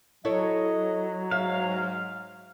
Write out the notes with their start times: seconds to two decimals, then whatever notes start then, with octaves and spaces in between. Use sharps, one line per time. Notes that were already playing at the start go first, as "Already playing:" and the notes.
0.25 F#3 E4 A4 C#5 D#5
1.31 G#2 E5 F5